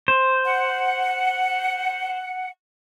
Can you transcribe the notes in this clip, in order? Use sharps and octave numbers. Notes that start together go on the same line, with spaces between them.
C5
F#5